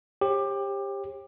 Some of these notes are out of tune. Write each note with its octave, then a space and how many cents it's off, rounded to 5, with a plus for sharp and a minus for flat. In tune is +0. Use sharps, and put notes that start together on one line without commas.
G4 +20 C#5 -45